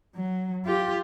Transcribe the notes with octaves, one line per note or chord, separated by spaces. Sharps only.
F#3
F4 G4